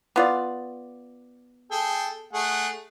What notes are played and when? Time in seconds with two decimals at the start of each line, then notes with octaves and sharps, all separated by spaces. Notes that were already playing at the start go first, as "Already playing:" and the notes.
0.16 B3 F4 D5
1.71 G#4 A4 G5
2.33 A3 G#4 F#5